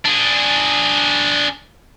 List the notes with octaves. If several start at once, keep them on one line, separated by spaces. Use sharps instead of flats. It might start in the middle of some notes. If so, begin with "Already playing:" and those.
D4 G#4